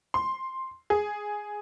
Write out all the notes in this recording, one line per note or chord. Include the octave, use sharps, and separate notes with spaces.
C6
G#4